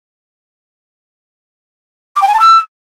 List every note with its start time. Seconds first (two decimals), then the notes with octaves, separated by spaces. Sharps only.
2.16 D6
2.21 G5
2.27 G#5
2.33 A5
2.39 E6